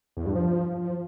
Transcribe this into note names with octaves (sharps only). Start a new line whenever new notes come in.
E2
G2
F3